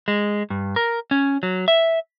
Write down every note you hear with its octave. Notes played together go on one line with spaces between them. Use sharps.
G#3
G2
A#4
C#4
F#3
E5